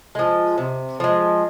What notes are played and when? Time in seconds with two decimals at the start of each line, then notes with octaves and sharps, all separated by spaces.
0.15 F3 G#3
0.58 C3
1.00 F3 G#3